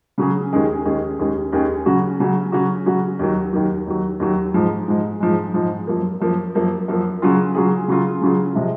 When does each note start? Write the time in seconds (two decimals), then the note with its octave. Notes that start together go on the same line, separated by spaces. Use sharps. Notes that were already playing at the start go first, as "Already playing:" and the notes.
0.18 C#3 F#3 C#4 G#4
0.52 D#2 D#3 G#3 C#4 G#4
0.85 D#2 D#3 G#3 C#4 G#4
1.19 D#2 D#3 G#3 C#4 G#4
1.52 D#2 D#3 G#3 C#4 G#4
1.86 C#3 F#3 C#4 F#4
2.20 C#3 F#3 C#4 F#4
2.52 C#3 F#3 C#4 F#4
2.86 C#3 F#3 C#4 F#4
3.19 D#2 D#3 F#3
3.53 D#2 D#3 F#3
3.87 D#2 D#3 F#3
4.20 D#2 D#3 F#3
4.54 G#2 F3 G#3
4.88 G#2 F3 G#3
5.20 G#2 F3 G#3
5.54 G#2 F3 G#3
5.87 F#2 F3 A#3
6.21 F#2 F3 A#3
6.55 F#2 F3 A#3
6.88 F#2 F3 A#3
7.22 C#3 F#3 C#4 F4 G#4
7.55 C#3 F#3 C#4 F4 G#4
7.88 C#3 F#3 C#4 F4 G#4
8.22 C#3 F#3 C#4 F4 G#4
8.55 C3 F3 G#3